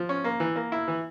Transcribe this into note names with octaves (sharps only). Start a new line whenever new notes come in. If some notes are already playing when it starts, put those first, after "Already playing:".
Already playing: F3
C#4
A#3
E3
A#3
E4
E3